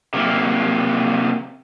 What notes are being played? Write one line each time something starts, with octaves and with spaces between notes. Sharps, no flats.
C3 F#3 A#3